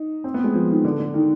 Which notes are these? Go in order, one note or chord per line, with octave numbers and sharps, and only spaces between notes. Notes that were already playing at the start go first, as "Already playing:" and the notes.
Already playing: D#4
C4
B3
G#3
F3
D#3
D3
D3
D#3